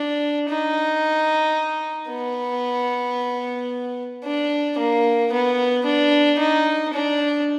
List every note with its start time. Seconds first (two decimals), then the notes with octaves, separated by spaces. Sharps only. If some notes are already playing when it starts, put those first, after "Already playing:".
Already playing: D4
0.49 D#4
2.09 B3
4.24 D4
4.78 A#3
5.32 B3
5.85 D4
6.39 D#4
6.93 D4